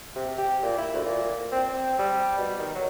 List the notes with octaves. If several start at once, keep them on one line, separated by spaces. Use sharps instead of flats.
C3
G4
A#2
E4
D2
A#2
C4
C4
G3
B2
D#3
F#3